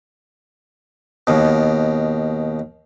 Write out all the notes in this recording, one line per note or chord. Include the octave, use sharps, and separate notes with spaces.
D#2 B2